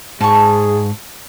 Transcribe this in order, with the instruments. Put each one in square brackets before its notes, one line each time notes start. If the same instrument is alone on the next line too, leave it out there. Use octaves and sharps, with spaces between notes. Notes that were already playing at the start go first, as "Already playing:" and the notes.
[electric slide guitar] G#2 [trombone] G#4 [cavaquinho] A5 C#6